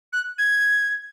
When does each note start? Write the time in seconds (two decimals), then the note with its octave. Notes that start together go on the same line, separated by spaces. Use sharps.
0.13 F#6
0.38 G#6